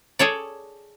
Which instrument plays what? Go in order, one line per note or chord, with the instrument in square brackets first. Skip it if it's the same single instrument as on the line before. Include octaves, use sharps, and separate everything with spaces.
[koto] G#4 A4 C#5 D5